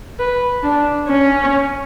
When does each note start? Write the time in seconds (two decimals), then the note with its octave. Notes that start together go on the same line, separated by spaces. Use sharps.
0.19 B4
0.63 D4
1.08 C#4